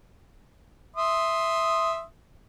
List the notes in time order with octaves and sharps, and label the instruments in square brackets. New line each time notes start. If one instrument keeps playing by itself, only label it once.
[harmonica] E5 C6 D#6